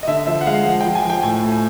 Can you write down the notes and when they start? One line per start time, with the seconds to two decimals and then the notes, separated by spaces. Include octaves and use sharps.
0.03 D#5
0.07 D3 E5
0.27 F3 E5
0.41 F#5
0.46 G#3 F5
0.65 F3 F#5
0.81 G5
0.85 F3
0.95 G#5
1.05 F3 G5
1.23 A2 G#5
1.43 A2
1.52 G#5